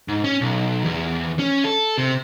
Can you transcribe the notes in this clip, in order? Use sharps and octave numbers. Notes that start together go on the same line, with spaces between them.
G#2
C#4
B1
E2
C#4
A4
C3